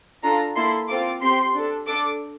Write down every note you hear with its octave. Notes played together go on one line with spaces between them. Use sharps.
D4 F4 A4 A#5
A#3 E4 A4 C6
C4 F4 A4 D6
C4 G4 C6
D4 A4
D4 A4 D6